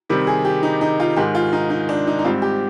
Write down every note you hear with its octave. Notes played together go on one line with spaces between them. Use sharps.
C3 D#3 G3 C4
G#4
G4
D#4
D#4
F4
G#2 D#3 G#3 G4
F4
D#4
D#4
D4
D#4
D#4
G#2 G3 C4 F4
G4